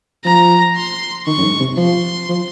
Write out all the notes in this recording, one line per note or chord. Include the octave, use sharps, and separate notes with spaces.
F3 A#5
C6
D#3 C#6
F#2
G#2
C3
F3 C6
F3